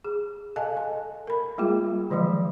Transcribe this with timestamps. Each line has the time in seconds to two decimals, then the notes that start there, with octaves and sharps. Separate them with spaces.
0.04 G#4
0.56 A4 D#5 F5 G#5 A5
0.77 A4
1.27 A#4 B5
1.58 G3 G#3 A#3 F4 G#4
2.10 D3 D#3 F3 F#3 G#3